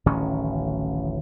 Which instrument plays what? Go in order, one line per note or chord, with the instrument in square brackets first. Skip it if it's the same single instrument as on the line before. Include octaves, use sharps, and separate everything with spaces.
[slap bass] D1 A1 D#3 C#4